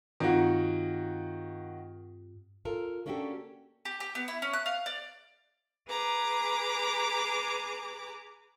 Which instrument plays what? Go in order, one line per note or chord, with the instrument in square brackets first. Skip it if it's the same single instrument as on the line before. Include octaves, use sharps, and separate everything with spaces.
[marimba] G2 C4 F4 [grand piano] D#3 A#3 F#4
[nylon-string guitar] F4 A4 A#4
A#3 C#4 D4 F#4 G4 A4
[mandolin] G4
G4
B3
E4
C#4
F#6
F5
D5
[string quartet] G#4 B4 A#5 D6